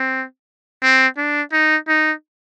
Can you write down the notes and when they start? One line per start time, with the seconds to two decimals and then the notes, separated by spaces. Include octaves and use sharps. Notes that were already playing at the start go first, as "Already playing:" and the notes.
Already playing: C4
0.83 C4
1.17 D4
1.53 D#4
1.88 D#4